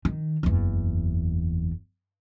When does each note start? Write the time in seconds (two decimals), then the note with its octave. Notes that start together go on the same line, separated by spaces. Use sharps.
0.05 D#3
0.43 F#1 E2